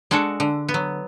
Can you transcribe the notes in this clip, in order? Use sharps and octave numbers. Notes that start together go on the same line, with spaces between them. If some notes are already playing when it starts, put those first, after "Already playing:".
G#3 D4 F#4 A4
D3
B3
F#3